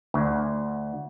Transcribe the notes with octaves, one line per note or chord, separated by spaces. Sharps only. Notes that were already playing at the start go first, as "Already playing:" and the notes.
D2